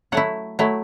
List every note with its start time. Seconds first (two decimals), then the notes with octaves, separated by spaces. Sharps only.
0.12 F#3 A3 E4 F#5
0.59 F#3 A3 E4